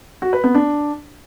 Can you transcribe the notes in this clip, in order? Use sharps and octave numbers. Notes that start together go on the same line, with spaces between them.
F#4
B4
B3
D4